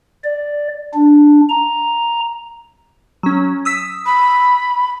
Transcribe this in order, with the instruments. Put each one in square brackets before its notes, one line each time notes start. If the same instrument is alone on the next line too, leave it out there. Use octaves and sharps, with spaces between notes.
[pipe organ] D5
D4
A#5
[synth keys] F#3 C#4
D#6 E6 B6
[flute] B5